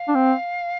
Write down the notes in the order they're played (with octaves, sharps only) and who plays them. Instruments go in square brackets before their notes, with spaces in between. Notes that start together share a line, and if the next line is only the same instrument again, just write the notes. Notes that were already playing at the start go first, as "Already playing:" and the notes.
Already playing: [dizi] F5
[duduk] D4
C4